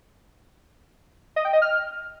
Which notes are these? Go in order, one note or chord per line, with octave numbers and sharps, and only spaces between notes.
D#5
G5
D#5
F6